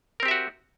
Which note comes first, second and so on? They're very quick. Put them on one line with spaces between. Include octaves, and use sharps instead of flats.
A#4 C4 G4 E5 F#4